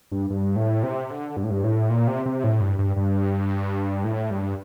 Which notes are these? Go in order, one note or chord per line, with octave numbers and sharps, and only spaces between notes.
G2
G2
A2
C3
D3
G2
A2
G2
A2
A#2
C3
C3
A2
G2
G2
G2
A2
G2